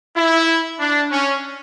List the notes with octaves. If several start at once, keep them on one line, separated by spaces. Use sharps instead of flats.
E4
D4
C#4